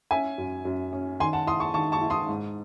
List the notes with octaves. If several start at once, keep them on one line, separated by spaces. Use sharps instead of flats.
C#4 E5 G#5
F#2
F#2
C#4
D#3 G#5 C6
F#5 A5
E4 C6 D#6
A5 C#6
D#3 A5 C#6
A5 C#6
E4
C6 D#6
G#2